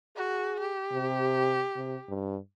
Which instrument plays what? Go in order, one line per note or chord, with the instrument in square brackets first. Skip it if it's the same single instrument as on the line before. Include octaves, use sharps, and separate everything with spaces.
[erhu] F#4 [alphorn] G#4
[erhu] G4
[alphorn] C3
C3
G2